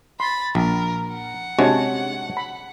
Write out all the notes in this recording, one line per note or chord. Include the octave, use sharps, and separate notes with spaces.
B5 C6 A6
A#1 A#4
F#5
C3 G#3 C#4 D4 F#4 C#5
B5